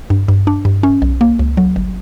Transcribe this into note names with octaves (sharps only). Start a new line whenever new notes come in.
G2
G2
D4
G2
C#4
B1
A#3
C#2
F#3
G1